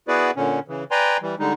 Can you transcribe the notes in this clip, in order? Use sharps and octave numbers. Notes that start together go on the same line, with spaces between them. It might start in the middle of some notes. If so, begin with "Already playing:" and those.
B3 E4 F#4 G#4 B4 D5
A#2 D3 C#4
C#3 E3
B4 D5 G5 G#5 A#5 C6
E3 G3
D3 G3 G#3 D#4